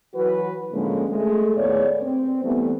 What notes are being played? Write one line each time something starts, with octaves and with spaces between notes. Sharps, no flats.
E3 F#3 F#4 B4
A2 D3 F3 G#3 A#3 C#4
G#3 A3
D#2 A2 B3 G#4 C#5 D5
C4
E3 G3 A3 B3